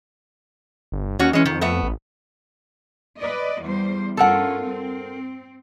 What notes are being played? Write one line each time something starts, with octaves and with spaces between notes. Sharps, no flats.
G1
D#2 C#4 F#4 C#5
E3 G#3 C#4
F2 D#3
A3 B3 E5
A1
B4 D5 D#5
E2 G3 C5
G2 C#4 F4 A4 A#4 F#5
C4